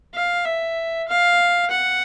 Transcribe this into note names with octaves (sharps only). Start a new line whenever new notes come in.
F5
E5
F5
F#5